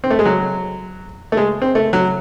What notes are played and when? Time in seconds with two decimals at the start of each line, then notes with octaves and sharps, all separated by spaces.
0.04 C4
0.10 A3
0.19 G#3
0.25 F#3
1.32 A3
1.37 G#3
1.62 C4
1.75 A3
1.93 F#3